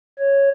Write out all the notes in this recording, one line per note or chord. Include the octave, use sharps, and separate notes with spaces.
C#5